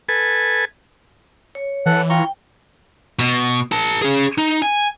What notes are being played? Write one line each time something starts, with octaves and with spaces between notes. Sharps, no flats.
A4 B4 G#5
C#5
E3 A4 F#5
F4 G5 A#5 C#6
B2
A#4 A5
C#4 G#4
D#4
G#5